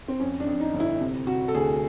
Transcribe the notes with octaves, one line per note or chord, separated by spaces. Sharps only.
C4
F2 C#4
D4
F2
D#4
G1
E4
C3
C3 F#4
A4
D2 G#4